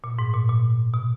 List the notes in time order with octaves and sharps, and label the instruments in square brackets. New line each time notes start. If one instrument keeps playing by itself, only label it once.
[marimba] A#2
G#2
A#2
A#2
B2